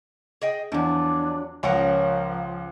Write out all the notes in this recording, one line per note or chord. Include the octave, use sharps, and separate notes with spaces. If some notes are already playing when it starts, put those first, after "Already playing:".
G#4 D#5 G5
E2 F3 F#3 D4
C#2 F3 C#4 A#4 C#5 F#5